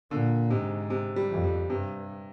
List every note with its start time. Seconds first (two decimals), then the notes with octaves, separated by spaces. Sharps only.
0.10 A#2 D3
0.50 G#2 C3
0.90 C3
1.16 G3
1.30 F2
1.44 G3
1.70 G2 C3